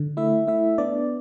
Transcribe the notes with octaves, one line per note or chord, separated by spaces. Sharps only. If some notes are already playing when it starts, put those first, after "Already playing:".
Already playing: D3
A3 E4 E5
A3 E4 E5
B3 D4 D5